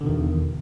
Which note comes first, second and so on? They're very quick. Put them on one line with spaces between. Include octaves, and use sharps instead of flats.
D3 B2 D#3 E2